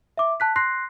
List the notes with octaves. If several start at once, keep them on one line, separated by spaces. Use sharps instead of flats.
E5 D6
A5 F#6 B6
C6 F#6 A#6 C7